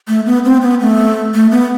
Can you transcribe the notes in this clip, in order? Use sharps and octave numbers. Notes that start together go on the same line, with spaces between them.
A3
B3
C4
B3
A3
A3
B3